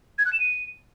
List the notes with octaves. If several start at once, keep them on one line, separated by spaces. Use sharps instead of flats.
G#6
F#6
E7
D#7